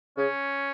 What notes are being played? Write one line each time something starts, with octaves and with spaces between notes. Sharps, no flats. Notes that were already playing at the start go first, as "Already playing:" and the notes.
C#3 C#4